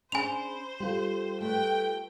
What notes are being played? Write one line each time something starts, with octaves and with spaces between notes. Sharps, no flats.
C#4 D4 G#4 C5 G#5 B5 C6 F7
G3 F4 G4 A4
A3 G4 B4 G5